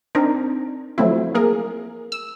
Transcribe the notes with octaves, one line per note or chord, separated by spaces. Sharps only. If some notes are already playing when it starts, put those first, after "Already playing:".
C4 D4 D#4 A#4
F3 F#3 A3 C4 E4
A#3 G#4 A#4
E6